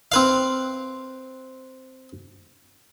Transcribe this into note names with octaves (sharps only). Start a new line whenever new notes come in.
C4 B4 F5